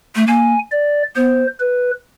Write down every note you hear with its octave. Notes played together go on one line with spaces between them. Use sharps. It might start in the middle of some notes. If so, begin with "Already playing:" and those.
A3
A#3 G#5
D5
B3 C5
B4